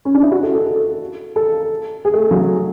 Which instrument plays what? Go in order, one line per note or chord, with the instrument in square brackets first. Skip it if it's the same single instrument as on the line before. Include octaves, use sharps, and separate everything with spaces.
[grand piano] C#4
D4
E4
F#4
A4
A4
A4
A4
G#4
A3
F#3